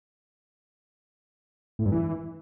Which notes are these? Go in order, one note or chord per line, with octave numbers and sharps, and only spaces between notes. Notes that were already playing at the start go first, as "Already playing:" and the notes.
A2
G2
E3